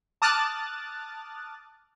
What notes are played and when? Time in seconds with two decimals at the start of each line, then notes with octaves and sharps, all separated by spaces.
0.22 A5 D6 D#6 F6 F#6 A6